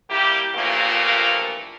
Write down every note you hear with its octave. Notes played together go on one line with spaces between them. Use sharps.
G3 A#3 E4 G4
E2 G2 A#2 F3 A3 A#3